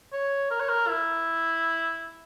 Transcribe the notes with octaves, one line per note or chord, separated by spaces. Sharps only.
C#5
A#4
C#5
A#4
E4